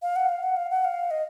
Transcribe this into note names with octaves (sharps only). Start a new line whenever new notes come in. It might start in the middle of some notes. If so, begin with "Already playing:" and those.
F5
F#5
F5
F#5
F5
F#5
F5
D#5